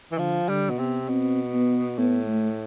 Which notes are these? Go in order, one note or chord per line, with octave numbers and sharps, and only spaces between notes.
E3
D3 F3
D3 G3
B2
C3 B3
B2 C4
B3
A2 B3
A3